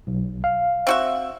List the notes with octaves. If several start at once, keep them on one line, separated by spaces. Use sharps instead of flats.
B1
F5
C4 F#4 E5